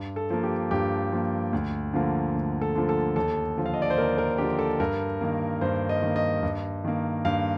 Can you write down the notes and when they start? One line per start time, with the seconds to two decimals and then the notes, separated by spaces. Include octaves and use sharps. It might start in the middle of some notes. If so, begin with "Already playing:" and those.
Already playing: G2
0.16 A4
0.30 F3 A#3
0.43 G4
0.71 G2 G4
1.12 F3 A#3
1.53 D2
1.93 D3 F3 A#3
2.35 D2
2.61 A4
2.75 D3 F3 A#3
2.89 A4
3.16 D#2 A4
3.57 D3 F3
3.66 F5
3.74 D#5
3.82 D5
3.90 C5
3.98 D#2 A#4
4.18 A#4
4.38 D3 F3 G4
4.59 A4
4.80 G2 A#4
5.21 D#3 A#3
5.61 G2 C5
5.89 D#5
6.02 D#3 A#3
6.16 D#5
6.43 G2
6.84 D#3 A#3
7.25 G2 F5